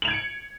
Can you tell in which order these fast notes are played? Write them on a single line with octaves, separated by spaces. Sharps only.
F#7 F7 G#6 D7 C#7